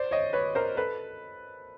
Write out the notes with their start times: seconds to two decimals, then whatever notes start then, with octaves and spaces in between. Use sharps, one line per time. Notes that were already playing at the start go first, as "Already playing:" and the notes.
Already playing: C5 D5
0.11 C#5 D#5
0.33 B4 C#5
0.55 A#4 C5
0.77 A4 B4